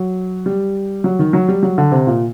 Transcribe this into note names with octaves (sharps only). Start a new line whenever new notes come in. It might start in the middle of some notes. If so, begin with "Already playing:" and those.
Already playing: F#3
G3
F#3
D#3
F#3
G3
F#3
D3
C3
A#2